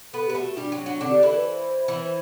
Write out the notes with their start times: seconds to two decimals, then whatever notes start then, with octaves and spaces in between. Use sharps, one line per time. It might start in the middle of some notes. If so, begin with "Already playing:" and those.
0.13 B3 A4 B4
0.27 G4 B4
0.35 A3 A4
0.42 F#4
0.57 G3 D4 G4
0.72 F#3 F#4
0.79 D4
0.86 F#3 F#4
1.01 D3 C4 D4
1.12 G4
1.23 E3 E4 A4
1.33 B4
1.44 C5
1.88 E3 E4